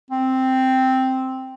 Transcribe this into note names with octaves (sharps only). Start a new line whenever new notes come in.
C4